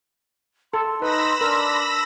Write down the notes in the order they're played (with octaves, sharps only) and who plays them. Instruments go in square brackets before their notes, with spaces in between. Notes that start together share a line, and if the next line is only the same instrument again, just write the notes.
[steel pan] A4 [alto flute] C6
[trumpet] D#4 [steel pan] B4 [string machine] B5 E6 A#6
[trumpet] D4 [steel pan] A#4